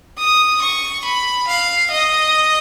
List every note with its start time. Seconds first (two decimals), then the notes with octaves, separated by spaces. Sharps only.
0.18 D#6
0.62 C#6
1.05 B5
1.48 F5
1.91 D#5